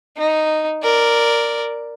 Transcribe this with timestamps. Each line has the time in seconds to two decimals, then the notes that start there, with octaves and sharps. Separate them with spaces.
0.17 D#4
0.83 A#4 D5